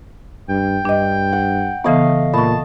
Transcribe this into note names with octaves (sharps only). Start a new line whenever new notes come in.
G2 G5
G2 D4 D#5
F#5
C#3 E3 A3 B3 D#5 F5
A#2 D#5 A5 B5 C#6